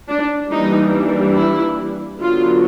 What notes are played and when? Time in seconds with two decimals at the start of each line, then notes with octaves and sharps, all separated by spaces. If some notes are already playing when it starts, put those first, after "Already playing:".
0.10 D4
0.52 E3 G3 A#3 D4 D#4
1.36 E4
2.20 D3 F#3 B3 F4